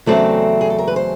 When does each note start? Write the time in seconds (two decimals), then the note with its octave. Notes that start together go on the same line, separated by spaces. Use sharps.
0.06 E2 C#3 F#3 A3 C4 D5
0.61 G#4
0.70 A4
0.78 A#4
0.88 B4
0.96 C5